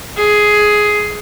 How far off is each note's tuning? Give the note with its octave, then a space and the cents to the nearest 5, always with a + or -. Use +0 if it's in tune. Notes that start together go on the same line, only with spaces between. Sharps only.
G#4 +10